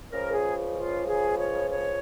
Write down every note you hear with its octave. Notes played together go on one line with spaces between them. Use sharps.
C#2 C#3 F3 A#4
G#4
F4
G#4
C#5
C#5